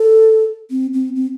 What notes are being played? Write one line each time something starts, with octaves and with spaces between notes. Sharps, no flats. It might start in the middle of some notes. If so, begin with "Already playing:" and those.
Already playing: A4
C4
C4
C4